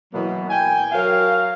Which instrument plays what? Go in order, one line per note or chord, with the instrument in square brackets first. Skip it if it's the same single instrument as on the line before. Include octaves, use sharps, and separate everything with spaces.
[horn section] B2 E3 F#3 A#3 B3
G5 G#5
F#3 A#4 F5